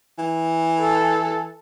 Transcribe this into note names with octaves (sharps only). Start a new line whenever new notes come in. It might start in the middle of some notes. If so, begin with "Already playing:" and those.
E3
A4